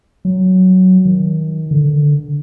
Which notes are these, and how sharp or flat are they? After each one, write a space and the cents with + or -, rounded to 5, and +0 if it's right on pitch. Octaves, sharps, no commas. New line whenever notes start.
F#3 +5
D#3 +25
D3 +0